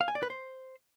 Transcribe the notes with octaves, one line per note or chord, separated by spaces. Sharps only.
F5
G#5
D5
B4
C5